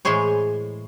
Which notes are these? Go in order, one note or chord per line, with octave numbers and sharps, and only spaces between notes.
A2 E3 G#3 G#4 C5 C#5